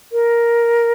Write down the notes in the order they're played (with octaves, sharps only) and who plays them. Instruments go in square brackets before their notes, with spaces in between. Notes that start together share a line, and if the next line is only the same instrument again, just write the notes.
[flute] A#4